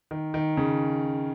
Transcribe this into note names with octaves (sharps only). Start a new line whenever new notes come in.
D#3
D#3
C#3